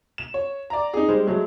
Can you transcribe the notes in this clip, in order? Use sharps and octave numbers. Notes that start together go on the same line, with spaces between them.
E7
C#5
D5 A#5
D#4 G#4
G3 G#3 C5
F#3 G#3 A3